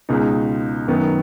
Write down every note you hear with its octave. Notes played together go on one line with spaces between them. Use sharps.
C#2 B2 G#3 D#4
F#2 D#3 F#3 B3 D#4